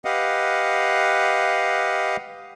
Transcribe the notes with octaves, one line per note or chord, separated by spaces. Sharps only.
G4 B4 D#5 F5 F#5